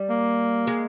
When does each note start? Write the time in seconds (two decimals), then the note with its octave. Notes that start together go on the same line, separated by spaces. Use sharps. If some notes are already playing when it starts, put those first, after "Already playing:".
Already playing: G3
0.09 A#3
0.67 G#3